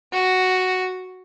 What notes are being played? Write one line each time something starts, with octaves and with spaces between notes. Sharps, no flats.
F#4